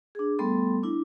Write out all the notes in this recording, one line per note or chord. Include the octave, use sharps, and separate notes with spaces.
D4 G#4
G3 A3 B3 A4 C6
D4 E4